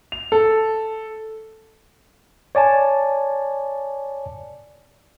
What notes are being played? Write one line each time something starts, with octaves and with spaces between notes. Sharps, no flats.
F7
A4
C#5 D5 G#5 A5